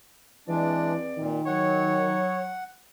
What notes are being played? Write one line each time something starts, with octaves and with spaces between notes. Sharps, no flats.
E2 E3 G#3 C4 D4 D5
A#2 D#3
F#3 C#5 F#5